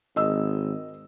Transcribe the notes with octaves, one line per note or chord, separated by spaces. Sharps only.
G#1 D#5 E6